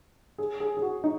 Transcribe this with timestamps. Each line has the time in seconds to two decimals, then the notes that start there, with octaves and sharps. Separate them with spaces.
0.38 G#4
0.60 G#4
0.77 G#4
0.82 F#4
1.04 D#4